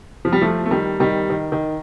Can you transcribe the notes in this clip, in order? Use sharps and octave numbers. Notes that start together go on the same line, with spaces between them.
F3
G3
F3 A3
A3
D#3 G3
D#3 G3
D#3
D#3